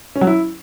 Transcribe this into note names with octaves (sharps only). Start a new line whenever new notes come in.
C#4
F#3
E4